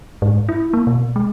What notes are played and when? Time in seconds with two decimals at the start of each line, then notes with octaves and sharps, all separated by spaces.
0.22 G#2
0.49 E4
0.73 A#3
0.87 B2
1.16 G#3